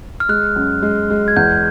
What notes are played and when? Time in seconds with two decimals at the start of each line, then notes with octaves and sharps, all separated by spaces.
0.20 F6
0.29 G#3 F#6
0.56 F#2
0.82 G#3
1.10 G#3
1.28 G#6
1.36 E2 G6